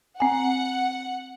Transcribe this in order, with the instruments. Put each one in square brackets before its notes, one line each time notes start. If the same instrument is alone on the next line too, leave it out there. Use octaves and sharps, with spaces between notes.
[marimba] C4 G#5 [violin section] F#5